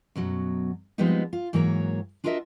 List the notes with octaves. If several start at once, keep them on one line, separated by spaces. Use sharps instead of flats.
F#2 B2 F#3
F3 G3 G#3 B3 C4 D#4
F4
G#2 E3 F#3 A#3 A#4 C#5
D4 F4 F#4 A#4 D#5 E5